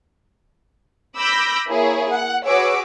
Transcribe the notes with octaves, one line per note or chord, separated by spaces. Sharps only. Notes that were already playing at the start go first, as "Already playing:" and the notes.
B5 D6 E6 G6 A#6
A#3 E4 G#4 C#5
F#5
F#4 G#4 B4 C#5 D6 E6